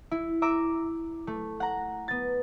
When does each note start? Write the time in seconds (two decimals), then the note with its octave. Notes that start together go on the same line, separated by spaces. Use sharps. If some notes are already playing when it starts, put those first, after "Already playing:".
0.11 E4
0.42 E5 A#5 D6 E6
1.27 A3
1.60 F#5 A#5
2.08 B3 A6